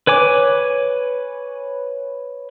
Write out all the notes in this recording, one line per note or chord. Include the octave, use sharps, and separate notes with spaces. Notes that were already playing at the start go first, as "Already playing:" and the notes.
B4 C#5 G#5 D6